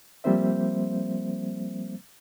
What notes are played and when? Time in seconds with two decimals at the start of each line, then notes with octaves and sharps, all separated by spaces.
0.24 F3 G3 A#3 C4 C5 E5